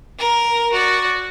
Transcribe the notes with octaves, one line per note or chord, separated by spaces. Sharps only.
A#4
F#4 D5